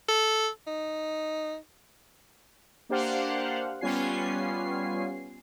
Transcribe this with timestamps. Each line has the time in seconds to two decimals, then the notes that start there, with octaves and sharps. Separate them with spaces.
0.08 A4
0.67 D#4
2.89 A#3 D4 G4 C5 F5 F#5
3.81 G3 B3 C#4 F4 G#5 C7